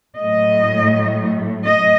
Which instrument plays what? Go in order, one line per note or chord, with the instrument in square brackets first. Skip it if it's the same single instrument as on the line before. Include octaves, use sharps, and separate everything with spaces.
[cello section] A2 F#3 A3 D#5
D#5